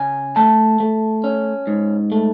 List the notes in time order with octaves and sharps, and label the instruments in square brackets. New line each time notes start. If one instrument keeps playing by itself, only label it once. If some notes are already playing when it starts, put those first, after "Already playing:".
Already playing: [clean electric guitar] C#3 G#5
A3 A5
A3
C#4
G#2
A3